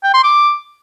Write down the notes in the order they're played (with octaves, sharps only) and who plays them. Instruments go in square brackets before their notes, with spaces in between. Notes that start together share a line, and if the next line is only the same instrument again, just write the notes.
[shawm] G5
C6
D6